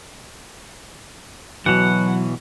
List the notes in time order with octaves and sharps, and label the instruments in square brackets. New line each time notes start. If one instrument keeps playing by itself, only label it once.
[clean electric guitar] B2 E3 [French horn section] F#3 [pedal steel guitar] F#5